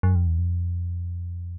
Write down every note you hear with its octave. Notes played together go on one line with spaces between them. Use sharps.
F#2
F2
E2
F2